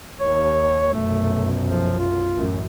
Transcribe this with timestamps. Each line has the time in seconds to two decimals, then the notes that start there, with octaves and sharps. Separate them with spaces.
0.20 D#2 C#5
0.93 F1 B1 F#2 A3
1.68 F3
1.99 F4
2.35 A1 F#2